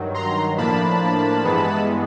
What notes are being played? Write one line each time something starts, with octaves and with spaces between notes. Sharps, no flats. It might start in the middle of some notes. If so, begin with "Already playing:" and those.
Already playing: G2 D#3 F#3
A#5 C6
A2 F3 A#3 D4 A5 B5
G2 E3 G#3 B3